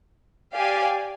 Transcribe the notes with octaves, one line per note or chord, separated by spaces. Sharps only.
G4 D5 F5 G#5